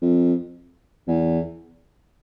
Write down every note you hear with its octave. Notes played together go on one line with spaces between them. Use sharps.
F2
E2